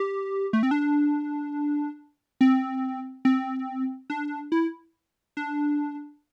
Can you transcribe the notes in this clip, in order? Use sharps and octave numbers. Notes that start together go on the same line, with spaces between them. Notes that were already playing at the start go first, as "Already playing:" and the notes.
Already playing: G4
A3
C4
D4
C4
C4
D4
E4
D4